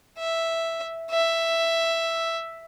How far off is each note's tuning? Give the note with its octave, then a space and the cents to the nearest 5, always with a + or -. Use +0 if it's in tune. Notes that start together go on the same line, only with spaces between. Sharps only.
E5 +0
E5 +5